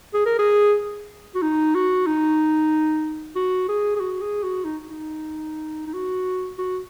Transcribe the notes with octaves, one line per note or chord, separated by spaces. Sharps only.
G#4
A#4
G#4
F#4
D#4
F#4
D#4
F#4
G#4
G#4
F#4
G#4
F#4
D#4
D#4
D#4
F#4
F#4